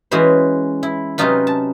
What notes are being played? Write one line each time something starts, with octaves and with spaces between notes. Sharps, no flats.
E3 G#3 C#4 F#4 B4 C5
E4
C3 F#3 C#4 D#4 F4 B4
A5